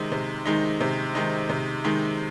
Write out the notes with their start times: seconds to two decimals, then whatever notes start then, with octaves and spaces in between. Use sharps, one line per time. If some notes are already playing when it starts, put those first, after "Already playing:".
Already playing: C3 D#3 G#3 D#4
0.12 C3
0.46 D#3 G#3 D#4
0.81 C3
1.15 D#3 G#3 D#4
1.49 C3
1.84 D#3 G#3 D#4